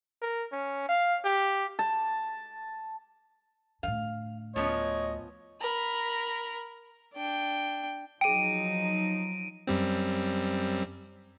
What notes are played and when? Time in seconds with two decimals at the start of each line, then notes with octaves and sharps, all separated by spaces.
0.22 A#4
0.52 C#4
0.89 F5
1.24 G4
1.79 A5
3.83 A2 D3 F5
4.56 D2 F3 B3 C#4 C#5 D#5
5.60 A#4 B5
7.15 D4 G5
8.21 F3 F#3 D#4 G#4 G5 D7 D#7
9.67 F#2 G3 C4